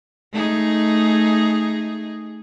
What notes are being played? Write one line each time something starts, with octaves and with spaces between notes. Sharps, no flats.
A3 D#4 G#4